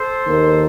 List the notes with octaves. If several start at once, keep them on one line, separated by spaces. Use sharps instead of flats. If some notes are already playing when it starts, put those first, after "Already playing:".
Already playing: A4 C5
D#2 D#3 A#3